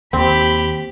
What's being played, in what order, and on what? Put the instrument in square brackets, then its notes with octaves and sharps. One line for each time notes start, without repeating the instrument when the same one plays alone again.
[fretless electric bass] D#2 [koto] C4 [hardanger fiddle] G4 B5